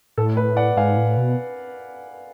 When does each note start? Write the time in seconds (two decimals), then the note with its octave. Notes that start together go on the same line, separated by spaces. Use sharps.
0.18 A2 A4
0.37 B4
0.56 D5 F#5
0.77 G#2 F5 G#5
0.97 A2
1.17 B2